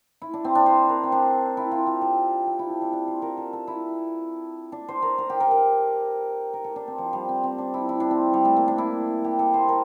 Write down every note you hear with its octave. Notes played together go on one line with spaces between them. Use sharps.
E4
D4
C4
D4
C5
A#4
C4
D4
E4
F4
G4
A4
G4
E4
E4
D4
D4
F4
A#4
A4
A4
E4
D4
C5
A#4
A#4
G4
A#4
A#4
A#4
A4
D4
C4
F3
G3
C4
C4
D4
E4
E4
D4
C4
G3
A3
A#3
D4
E4
G4
A4
C5
A#4